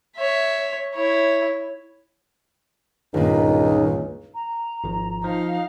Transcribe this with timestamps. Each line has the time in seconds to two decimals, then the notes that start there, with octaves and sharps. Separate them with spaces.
0.17 C#5 E5
0.94 E4 C#5
3.14 C#2 G2 A#2 D#3 D#4
4.34 A#5
4.84 G#1 F3
5.24 F3 D#4 F5